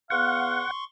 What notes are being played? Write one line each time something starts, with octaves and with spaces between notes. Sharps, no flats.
E2 B3 F5 F#5 C6 C#6